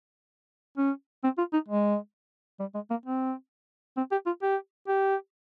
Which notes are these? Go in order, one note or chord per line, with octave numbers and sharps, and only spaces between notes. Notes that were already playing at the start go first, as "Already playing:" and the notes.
C#4
C4
F4
D#4
G#3
G3
G#3
A#3
C4
C4
G4
F4
G4
G4